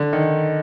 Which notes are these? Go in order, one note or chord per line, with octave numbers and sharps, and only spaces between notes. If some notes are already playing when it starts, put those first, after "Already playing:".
Already playing: D3
D#3